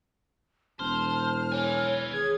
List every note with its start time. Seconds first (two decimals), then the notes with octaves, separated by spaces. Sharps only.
0.80 E1 C5 A5 F6
1.52 B4 C#5 G#5
2.13 G#4 G#6